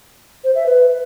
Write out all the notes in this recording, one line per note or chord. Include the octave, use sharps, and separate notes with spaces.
C5
E5
B4